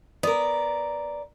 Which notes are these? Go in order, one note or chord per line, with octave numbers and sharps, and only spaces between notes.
B3 A#4 D5